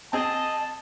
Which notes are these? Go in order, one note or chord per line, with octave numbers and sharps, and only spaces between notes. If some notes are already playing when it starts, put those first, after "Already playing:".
C4 G#4 D#5 A5